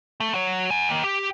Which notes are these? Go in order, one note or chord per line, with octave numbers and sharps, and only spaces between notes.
A3
F#4 C#5
F#5 G#5
D#3 A#3
G4